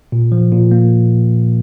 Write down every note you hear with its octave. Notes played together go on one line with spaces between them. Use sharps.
A#2
F3
A#2
A#3